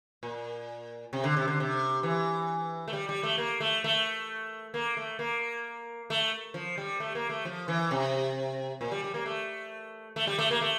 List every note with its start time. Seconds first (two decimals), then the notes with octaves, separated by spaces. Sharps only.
0.23 A#2
1.13 C3
1.24 D3
1.37 C3
1.48 D3
1.60 C3
2.03 E3
2.88 A3
2.93 G3
3.09 G3
3.23 A3
3.38 A#3
3.60 A3
3.84 A3
4.74 A#3
4.97 A3
5.19 A#3
6.10 A3
6.54 F3
6.78 G3
7.00 A3
7.15 A#3
7.29 A3
7.45 F3
7.68 E3
7.91 C3
8.81 A#2
8.92 G3
9.04 G3
9.14 A#3
9.26 A3
10.16 A3
10.27 G3
10.39 A3
10.51 A#3
10.61 A3